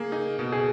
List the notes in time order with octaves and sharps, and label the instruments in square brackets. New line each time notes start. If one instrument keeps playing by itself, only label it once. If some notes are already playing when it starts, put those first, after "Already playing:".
Already playing: [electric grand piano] A#3 [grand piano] G#4
[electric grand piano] D#4 [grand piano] G#4
[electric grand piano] B2
[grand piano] G#4